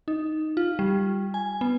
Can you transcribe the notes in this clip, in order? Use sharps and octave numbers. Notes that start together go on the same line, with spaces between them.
D#4
F4
G3
G#5
B3